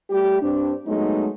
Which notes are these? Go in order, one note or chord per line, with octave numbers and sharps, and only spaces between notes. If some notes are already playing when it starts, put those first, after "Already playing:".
G3 A3 G4
G2 C4 D4
F#3 G#3 A3 B3 D#4